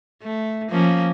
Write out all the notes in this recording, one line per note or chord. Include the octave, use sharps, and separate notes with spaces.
A3
F3 A#3 C#4